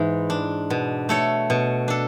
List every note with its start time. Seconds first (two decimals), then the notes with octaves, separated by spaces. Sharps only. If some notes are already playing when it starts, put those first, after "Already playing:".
Already playing: G#2 E3
0.30 D4
0.70 B2
1.09 A3 A4 C#5
1.50 B2
1.88 D4 A4